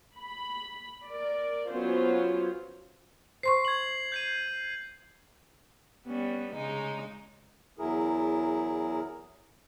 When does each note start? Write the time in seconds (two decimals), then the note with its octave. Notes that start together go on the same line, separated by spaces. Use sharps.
0.18 B5
1.06 A#4 D5
1.69 F#3 B3 C#4 F4 C5
3.43 C5 C6 C#6 C7
3.65 G#6 F#7
4.12 G6 C7 D#7
6.06 G3 B3 C#4
6.52 C#3 G#3 D#4
7.79 E2 F#3 E4 G#4 A#4